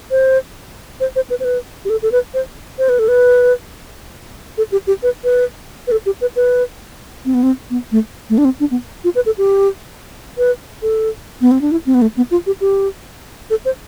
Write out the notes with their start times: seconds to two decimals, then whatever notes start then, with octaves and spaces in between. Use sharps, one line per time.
0.11 C5
1.00 C5
1.16 C5
1.30 B4
1.40 C5
1.45 B4
1.85 G4
1.90 A4
2.02 A4
2.12 B4
2.34 C5
2.78 C5
2.89 B4
2.99 A4
3.08 B4
4.58 A4
4.72 G4
4.87 G4
5.03 B4
5.24 B4
5.87 B4
5.92 A4
6.06 G4
6.21 B4
6.36 B4
7.25 C4
7.34 B3
7.43 C4
7.70 B3
7.92 A3
8.30 A3
8.38 D4
8.45 C4
8.60 D4
8.71 B3
9.04 F4
9.15 B4
9.26 A4
9.38 G4
10.38 B4
10.82 A4
11.41 B3
11.51 C4
11.61 D4
11.72 E4
11.86 C4
11.94 B3
12.02 A3
12.17 B3
12.31 F4
12.47 G4
12.61 G4
13.50 A4
13.65 C5